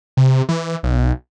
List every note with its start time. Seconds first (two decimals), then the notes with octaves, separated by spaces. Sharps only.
0.17 C3
0.49 E3
0.83 B1